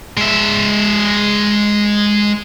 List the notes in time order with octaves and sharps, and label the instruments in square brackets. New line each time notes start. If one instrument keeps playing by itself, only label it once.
[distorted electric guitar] G#3 E5